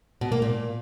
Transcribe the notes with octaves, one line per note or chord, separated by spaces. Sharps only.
B2
A#3
A#2